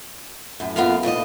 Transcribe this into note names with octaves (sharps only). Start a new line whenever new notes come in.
F#2 A2
F#2 B3 F4 A4 A#4 F5
D#2 A2 D5 D#5